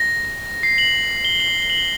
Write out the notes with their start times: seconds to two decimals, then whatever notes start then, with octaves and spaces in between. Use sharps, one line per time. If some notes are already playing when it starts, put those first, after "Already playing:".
Already playing: A#6
0.63 C7
0.78 F#7
1.25 G7
1.40 F#7
1.62 G7
1.70 F#7
1.78 G7